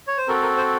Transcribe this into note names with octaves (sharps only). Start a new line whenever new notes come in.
C#5
C5
C4 F#4 A4 A#4
A#4
C5